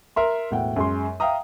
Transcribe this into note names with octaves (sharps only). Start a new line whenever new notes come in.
A#4 E5 C6
E1 A2 F#5 G5
F#2 G#3 C6
E5 F5 G5 A#5 D#6